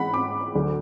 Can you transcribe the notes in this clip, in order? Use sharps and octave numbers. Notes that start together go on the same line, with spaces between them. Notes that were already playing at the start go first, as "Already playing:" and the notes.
Already playing: G#2 E3 F#5 B5
D6
D2 D3 F#3